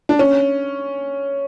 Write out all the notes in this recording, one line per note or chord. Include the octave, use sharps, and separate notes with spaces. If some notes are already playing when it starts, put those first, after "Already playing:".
D4
C#4